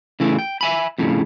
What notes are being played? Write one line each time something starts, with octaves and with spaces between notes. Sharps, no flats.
C#3 E3 A3
G5
E5 G#5 B5
F2 A2 C#3